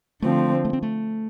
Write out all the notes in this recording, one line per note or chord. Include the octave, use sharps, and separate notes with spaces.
D3 F3 A3 C4
A3
C4
A3